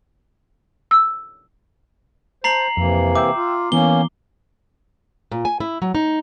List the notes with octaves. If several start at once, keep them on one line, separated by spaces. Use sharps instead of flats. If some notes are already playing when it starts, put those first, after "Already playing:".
E6
C5 A5 A#5 C7 F#7
F2 C3 E3 A#3
E5 G5 D6 E6
F4
E3 A#3 B3 C#4 G7
A#2
G#5
E4
F#3
D#4